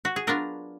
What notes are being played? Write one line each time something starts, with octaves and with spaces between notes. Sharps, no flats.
F#4
G#4
F#3 B3 D4 F4 A#4